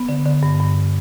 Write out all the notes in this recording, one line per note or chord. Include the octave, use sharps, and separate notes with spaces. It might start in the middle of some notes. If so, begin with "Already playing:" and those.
Already playing: B3
D3
D3
G2
G2